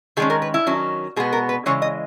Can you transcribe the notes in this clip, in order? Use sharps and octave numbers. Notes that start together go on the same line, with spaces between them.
D#3 G#3 C#4 G#4
A#4
B4
E4
D#3 F#3 C#4
B2 G#3 B3 G#4
A#4
B4
C#3 E3 G#3 C#5
D#5